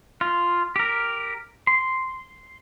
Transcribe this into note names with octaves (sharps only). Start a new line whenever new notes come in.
F4
G4 A#4
C6